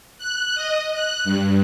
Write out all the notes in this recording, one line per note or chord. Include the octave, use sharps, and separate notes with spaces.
F#6
D#5
F#6
G2